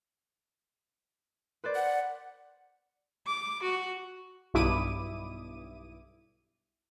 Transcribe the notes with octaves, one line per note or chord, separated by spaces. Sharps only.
B4 C5 D5
F#5
D6
F#4
B1 G2 E4 D6 D#6 D#7